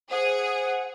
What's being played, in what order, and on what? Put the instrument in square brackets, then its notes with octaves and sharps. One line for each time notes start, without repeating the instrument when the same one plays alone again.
[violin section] G#4 [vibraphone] C5 [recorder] F#5